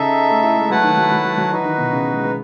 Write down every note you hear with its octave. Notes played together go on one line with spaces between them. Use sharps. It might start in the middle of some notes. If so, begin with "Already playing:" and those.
Already playing: C#3 D#4 A4 E5
A3
E4
G#3
F#3 A3 E4 B4 F#5 A5
D#3
F#3
F#3
F#3
F#3
E3 D#4 F#4 B4
D#3
B2
C#3
G#3
B3